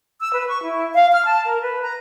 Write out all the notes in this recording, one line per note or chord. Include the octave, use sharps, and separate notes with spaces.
E6
B4
C#6
E4
F5
F6
A5
A#4
B4
A#5